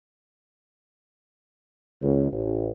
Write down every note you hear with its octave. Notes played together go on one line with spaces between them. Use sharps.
C#2
A1